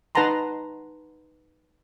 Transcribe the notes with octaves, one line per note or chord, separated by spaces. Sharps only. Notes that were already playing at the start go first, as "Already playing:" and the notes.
D#4 B4 F#5 A5 A#5 C6